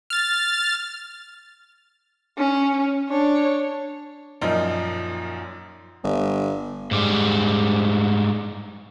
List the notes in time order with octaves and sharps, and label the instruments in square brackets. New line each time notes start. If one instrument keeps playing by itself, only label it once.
[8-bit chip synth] F6 A6
[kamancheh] C#4
D4 C#5
[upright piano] F#2 A#2 F3 D#4
[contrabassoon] G1
[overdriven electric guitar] G#2 G3